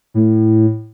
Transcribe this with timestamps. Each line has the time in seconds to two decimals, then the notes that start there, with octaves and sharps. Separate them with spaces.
0.14 A2